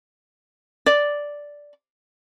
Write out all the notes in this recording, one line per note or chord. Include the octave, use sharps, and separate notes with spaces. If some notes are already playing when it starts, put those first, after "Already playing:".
D5